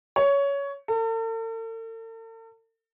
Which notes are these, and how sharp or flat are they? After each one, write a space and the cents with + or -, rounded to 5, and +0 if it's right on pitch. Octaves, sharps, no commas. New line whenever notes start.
C#5 +15
A4 +45